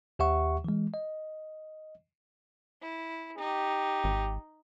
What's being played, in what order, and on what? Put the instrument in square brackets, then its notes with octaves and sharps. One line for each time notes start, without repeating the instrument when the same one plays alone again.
[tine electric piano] D#2 G4 E5 F#5 C#6
E3 G#3
D#5
[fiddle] E4
[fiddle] D#4 [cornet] G4
[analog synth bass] G#1